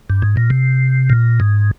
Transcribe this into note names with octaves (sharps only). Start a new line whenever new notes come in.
G2
G#2
A#2
C3
A#2
G#2